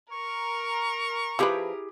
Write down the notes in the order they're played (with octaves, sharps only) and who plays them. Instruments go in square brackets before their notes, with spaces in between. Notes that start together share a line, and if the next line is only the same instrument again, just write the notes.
[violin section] A#4 [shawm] C#6
[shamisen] F3 B4 [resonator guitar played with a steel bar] E4 G4 G#4